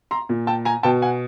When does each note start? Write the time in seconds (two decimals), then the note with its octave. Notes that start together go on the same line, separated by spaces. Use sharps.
0.11 A#5 C6
0.29 A#2
0.47 G5 A5
0.65 G#5 A#5
0.83 B2 G5 A5
1.02 F#5 G#5